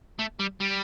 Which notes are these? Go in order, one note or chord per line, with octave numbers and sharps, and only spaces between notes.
A3
G3
G3